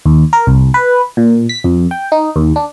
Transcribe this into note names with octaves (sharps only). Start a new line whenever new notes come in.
D#2
A#4
C2
B4
A#2
B6
F2
G5
D#4
D#2
D4